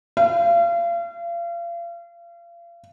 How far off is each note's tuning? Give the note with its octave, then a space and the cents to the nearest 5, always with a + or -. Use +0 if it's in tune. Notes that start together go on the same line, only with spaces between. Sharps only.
F5 -35